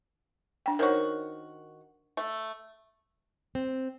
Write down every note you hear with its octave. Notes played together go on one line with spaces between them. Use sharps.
D4 G5
D#3 F#4 A#4 C5 C#5
A3
C4